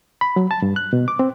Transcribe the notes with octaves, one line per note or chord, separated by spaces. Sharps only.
B5
F#3
A5
G2
F#6
B2
D6
C4